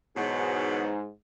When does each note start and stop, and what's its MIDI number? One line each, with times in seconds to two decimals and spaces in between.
0.17 0.89 40
0.17 1.09 44
0.17 0.89 47
0.17 0.89 54